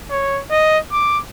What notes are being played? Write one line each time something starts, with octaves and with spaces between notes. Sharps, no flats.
C#5
D#5
D6